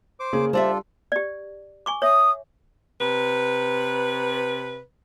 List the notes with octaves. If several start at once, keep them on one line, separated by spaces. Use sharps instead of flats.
C5 D6
C#3 A#3 G#4
G3 D4 F4 A4 C5 D5 E5
G4 D5
G#5 C#6 D6
C#5 E5 D#6
C3 B4